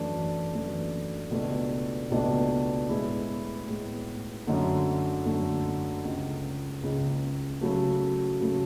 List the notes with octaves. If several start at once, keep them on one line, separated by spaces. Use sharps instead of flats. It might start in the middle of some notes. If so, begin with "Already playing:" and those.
Already playing: F#2 E3 A3 D4
F#2 E3 A3 D4
C#2 B2 A3 D4
C#2 B2 A3 D4
A2 G#3 B3 E4
A2 G#3 B3 E4
F#2 D3 A3
F#2 D3 A3
C#2 C#3 G#3
C#2 C#3 G#3
C#3 F#3 A3
C#3 F#3 A3